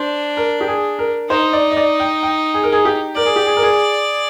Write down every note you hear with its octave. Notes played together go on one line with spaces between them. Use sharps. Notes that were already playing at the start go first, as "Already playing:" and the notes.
Already playing: D4 C5
A#4
G4
G#4
A#4
D#4 C5
D5
D#5
D5
G5
G5
G#4
A#4
G#4
G4
A#4 D5
G#4
G4
G#4
A#4
G#4